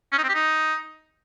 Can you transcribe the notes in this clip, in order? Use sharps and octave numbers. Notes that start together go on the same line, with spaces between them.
C#4
D#4
C4
G4
D#4